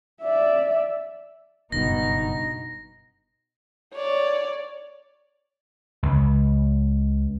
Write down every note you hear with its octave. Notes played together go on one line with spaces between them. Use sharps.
D5 E5
F#1 G2 B2 D#4 A#6
C#5 D5
C#2